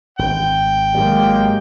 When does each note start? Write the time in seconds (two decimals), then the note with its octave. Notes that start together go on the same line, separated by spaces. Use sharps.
0.19 G#1 G5
0.95 G#1 D#3 F#3 G#3 A#3 G4